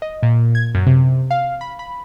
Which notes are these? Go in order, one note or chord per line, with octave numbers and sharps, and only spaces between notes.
D#5
A#2
G#6
F#2
C3
F5
B5
B5